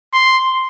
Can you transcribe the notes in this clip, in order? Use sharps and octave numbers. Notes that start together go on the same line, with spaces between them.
C6